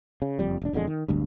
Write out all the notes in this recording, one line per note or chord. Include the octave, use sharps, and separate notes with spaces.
C#3
F#1 F2 G3
E1 D4
E1 F2 D3 G#3
D#3
D1 G1 D2 G2